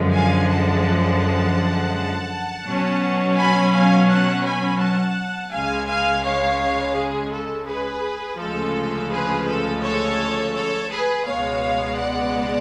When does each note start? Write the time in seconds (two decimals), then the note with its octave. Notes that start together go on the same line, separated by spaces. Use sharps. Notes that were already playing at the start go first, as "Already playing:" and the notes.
Already playing: F#2 D3 F3 G#3
0.14 F5 G#5
0.50 F#5 A5
2.65 B2 F#3 C#4
3.37 G#5 B5
3.72 F5 G#5
4.09 F#5 A5
4.44 G#5 B5
4.80 F#5 A5
5.52 C#2 C#3 G#3 F5 G#5
5.88 F5 G#5
6.23 C#5 F5
6.96 G#4
7.32 A4
7.67 G#4 B4
8.39 D2 C#3 F3 G#3 A4
9.10 G#4 B4
9.47 A4
9.83 A4 C#5
10.54 A4 C#5
10.90 G#4 B4
11.26 C#2 B2 G#3 B3 C#5 F5
11.97 D5 F#5